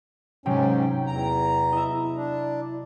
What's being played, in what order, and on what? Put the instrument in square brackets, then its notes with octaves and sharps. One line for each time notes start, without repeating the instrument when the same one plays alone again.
[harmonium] G#2 C#4 [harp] C3 F#3 [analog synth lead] G5
[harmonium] E2 A#5
[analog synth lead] E4 [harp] D#5 E5
[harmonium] D4